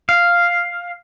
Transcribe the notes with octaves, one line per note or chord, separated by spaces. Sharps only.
F5